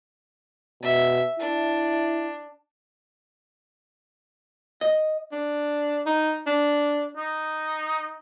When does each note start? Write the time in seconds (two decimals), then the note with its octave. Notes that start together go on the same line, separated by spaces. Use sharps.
0.82 B2 E5
1.40 D4 E4
4.81 D#5
5.32 D4
6.06 D#4
6.47 D4
7.17 D#4